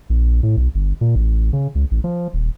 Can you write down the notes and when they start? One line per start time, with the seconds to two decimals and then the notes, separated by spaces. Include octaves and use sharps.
0.10 A#1
0.43 A2
0.57 B1
0.75 G1
1.01 A#2
1.15 A1
1.53 C#3
1.75 C#2
1.91 A1
2.04 F3
2.33 D#1